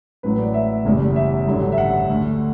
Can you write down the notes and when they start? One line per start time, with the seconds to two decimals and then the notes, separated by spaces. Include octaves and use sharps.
0.23 A1 A2 F#3 B4
0.38 D5
0.54 E5
0.85 F#1 E2 B2 G3
1.16 E5
1.47 A1 G2 D3 F#3
1.72 E5
1.78 F#5
2.08 D2 D3 A3